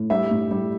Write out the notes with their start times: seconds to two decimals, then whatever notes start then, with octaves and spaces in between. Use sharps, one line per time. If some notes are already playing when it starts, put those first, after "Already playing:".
Already playing: A2
0.10 G3 E5
0.31 A2
0.51 G3